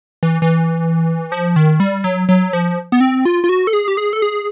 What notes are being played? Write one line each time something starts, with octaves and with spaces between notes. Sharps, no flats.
E3
E3
F3
D#3
G3
F#3
F#3
F3
B3
C4
F4
F4
F#4
A4
G#4
G4
G#4
A4
G#4